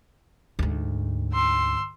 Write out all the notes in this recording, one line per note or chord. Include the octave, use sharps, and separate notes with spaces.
D2 G#2
C6 E6